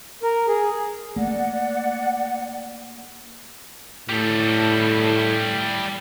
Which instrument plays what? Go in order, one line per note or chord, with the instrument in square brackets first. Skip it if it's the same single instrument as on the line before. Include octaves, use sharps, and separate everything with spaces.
[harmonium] A#4
G#4
[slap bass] A3 A#3 [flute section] D5 F#5
[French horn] A2 [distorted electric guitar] G3 A4